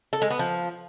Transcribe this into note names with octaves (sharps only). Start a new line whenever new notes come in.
A4
G#3
B3
F3